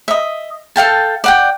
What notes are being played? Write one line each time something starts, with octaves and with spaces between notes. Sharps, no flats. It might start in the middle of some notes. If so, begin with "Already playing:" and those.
D#5 E5
A4 F5 G5 A5
D5 F#5 G5